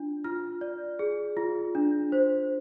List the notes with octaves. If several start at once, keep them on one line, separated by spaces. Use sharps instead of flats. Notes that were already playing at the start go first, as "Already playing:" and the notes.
Already playing: D4 F4
F4 F6
D5
G#4
F4
D4
C5